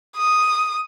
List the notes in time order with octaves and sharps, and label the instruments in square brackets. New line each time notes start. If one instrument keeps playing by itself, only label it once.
[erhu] D#6